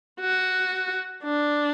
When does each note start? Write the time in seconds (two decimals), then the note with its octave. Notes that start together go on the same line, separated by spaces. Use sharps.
0.20 F#4
1.24 D4